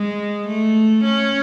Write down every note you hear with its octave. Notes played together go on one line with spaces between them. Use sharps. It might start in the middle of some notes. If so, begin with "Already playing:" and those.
Already playing: G#3
A3
C#4